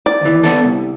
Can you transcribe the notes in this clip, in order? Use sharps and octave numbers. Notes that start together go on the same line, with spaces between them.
D5
D#2 E3
B3 D4 A4
C2